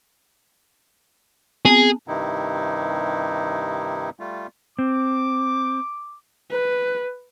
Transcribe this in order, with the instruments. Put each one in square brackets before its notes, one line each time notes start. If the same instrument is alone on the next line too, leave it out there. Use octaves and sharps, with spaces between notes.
[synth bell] B3 C4 [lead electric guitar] G#4
[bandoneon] G2 C3 D#3 D#4 E4
G3 A3 F4
[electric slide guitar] C4 [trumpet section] D6
[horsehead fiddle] B4